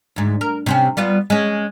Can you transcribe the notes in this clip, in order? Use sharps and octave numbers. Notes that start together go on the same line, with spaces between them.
D2 G#2
A#4
C3 C4 C#4
G3 B3 F4
G#3 C#4